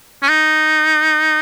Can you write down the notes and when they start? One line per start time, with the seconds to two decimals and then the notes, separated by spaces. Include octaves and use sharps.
0.23 C#4
0.28 D#4